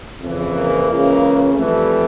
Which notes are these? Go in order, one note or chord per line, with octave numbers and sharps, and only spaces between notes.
F2 C#3 E3
A#3
C#2 C#3 E3
F2 E3 G3 A3